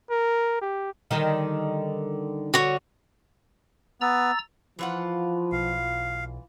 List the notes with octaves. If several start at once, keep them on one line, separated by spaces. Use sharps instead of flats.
A#4
G4
D3 D#3 G3
D3 F#4 C#5
B3 A#5 E6 A6
E3 F3 F4 F#5
B1 F5